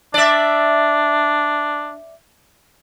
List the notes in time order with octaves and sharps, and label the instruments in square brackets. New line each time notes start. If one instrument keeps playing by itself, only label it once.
[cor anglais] D4 [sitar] D5 E5